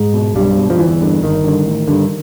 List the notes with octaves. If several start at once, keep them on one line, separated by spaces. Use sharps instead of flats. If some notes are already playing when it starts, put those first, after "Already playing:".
Already playing: G#2 G#3
B2
B1 G2 G3
B2
F3
G1 E2 E3
G2 D3
G1 D#3
G2 D3
A1
G2 D3